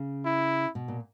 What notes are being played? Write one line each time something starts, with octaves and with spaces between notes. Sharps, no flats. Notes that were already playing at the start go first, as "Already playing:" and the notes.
Already playing: C#3
E4
B2
A#2